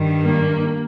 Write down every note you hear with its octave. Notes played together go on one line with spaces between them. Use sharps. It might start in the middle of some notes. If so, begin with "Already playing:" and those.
Already playing: G2 D#3 G3
A#3